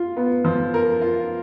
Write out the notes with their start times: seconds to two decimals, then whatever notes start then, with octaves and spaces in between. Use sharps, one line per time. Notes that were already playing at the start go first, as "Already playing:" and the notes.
Already playing: F4
0.17 B3
0.45 F3
0.74 A#4
1.01 F4